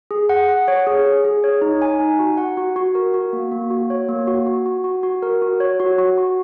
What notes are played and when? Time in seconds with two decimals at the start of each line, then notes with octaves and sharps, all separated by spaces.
0.11 G#4
0.29 F#5
0.48 F#5
0.68 C#5
0.87 G#4
1.06 G#4
1.25 G#4
1.44 C#5
1.62 D#4
1.82 G#5
2.00 D#4
2.19 F#4
2.37 F#5
2.57 F#4
2.76 F#4
2.95 A#4
3.14 F#4
3.33 A#3
3.52 A#3
3.70 F#4
3.90 C#5
4.09 A#3
4.27 F#4
4.47 F#4
4.66 F#4
4.84 F#4
5.03 F#4
5.23 A#4
5.42 F#4
5.60 C#5
5.80 F#4
5.98 F#4
6.18 F#4